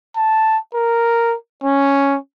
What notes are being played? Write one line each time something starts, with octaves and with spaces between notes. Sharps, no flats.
A5
A#4
C#4